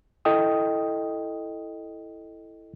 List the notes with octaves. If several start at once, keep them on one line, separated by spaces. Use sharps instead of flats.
E4 A4 D#5 G5 D#6